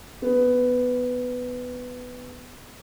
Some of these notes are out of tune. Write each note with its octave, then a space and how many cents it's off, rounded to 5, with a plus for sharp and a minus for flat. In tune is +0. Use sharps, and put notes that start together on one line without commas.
B3 +10